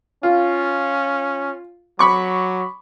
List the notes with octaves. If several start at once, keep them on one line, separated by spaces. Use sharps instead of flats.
C#4 F4
F#3 B5 C#6 D6